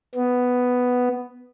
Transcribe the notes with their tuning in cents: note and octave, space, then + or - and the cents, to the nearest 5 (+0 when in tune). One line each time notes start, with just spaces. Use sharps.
B3 +5